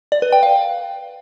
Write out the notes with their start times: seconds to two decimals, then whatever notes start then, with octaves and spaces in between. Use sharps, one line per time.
0.12 D5
0.22 B4
0.32 G5
0.43 F5